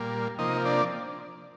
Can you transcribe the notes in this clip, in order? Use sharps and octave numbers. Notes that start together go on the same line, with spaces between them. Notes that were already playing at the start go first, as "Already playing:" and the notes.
Already playing: A#2 G3 A#3
C3 F3 A#3 D#4 D#5
D4 D5